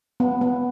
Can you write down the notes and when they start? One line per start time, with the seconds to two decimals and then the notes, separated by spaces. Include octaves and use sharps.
0.20 B3
0.41 B3